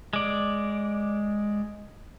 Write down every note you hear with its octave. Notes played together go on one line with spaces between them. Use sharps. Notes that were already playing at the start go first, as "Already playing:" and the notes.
G#3 D5